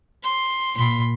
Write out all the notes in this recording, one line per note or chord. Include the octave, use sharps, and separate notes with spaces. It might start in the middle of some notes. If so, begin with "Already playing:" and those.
C6
A#2 B5 C6